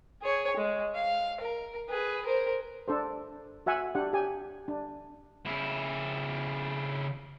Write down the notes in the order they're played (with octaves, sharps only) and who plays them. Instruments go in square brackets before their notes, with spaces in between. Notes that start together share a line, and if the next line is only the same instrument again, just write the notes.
[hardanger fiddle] G#4 C#5
G#3
F5
A#4
G#4 B4
A#4 C5
[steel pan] D4 A4 C5
F#4 E5 F#5 G#5
D4 G4 F#5
G4 G#5
D4
[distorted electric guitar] C#3 E4